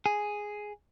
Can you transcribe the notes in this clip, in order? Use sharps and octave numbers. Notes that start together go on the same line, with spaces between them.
G#4